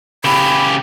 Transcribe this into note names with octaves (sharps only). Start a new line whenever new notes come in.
C#3 G4 B5